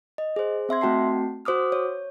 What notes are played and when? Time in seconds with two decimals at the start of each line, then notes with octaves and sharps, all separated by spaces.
0.18 D#5
0.36 G#4 C5
0.69 C4 E5 C6 G#6
0.81 A3 C4 F#4 G5 A5 C7
1.45 F#4 C5 D6 D#6 F6
1.72 C#5